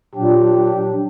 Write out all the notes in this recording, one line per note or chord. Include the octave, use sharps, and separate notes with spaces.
A#2 F#3 D4 G4